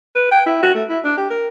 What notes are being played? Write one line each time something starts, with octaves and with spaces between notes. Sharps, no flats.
B4
G5
E4
F#4
A3
E4
D4
G4
A#4